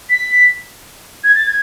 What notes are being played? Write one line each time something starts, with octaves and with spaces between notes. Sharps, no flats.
B6
G#6
A6
G#6